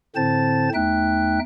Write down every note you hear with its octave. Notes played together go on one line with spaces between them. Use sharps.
A2 D3 C4 C5 A5 A6
E2 A3 D#4 E5 G5 F#6